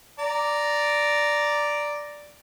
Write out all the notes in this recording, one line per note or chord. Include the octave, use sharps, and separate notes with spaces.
D5 A#5